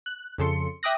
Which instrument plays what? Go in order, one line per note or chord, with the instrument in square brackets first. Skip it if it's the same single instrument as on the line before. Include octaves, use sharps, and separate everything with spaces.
[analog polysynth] F#6
F2 C#3 A4 C6 C#7
E5 G5 D6 D#6 F#6 A#6